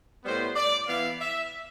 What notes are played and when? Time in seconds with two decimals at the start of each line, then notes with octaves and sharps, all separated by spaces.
0.24 A2 G3 B3 C5
0.56 D5
0.87 E3 B3 E4 F5
1.20 E5